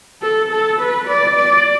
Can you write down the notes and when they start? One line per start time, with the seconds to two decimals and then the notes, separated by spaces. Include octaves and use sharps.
0.22 A4
0.51 A4
0.80 B4
1.08 D5
1.36 D5